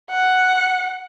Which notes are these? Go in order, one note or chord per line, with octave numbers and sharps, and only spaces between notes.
F#5